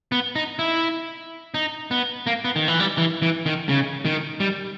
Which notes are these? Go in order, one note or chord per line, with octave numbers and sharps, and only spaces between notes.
B3
D#4
E4
D#4
B3
A#3
B3
D#3
E3
G3
E3
E3
D#3
C#3
D#3
G3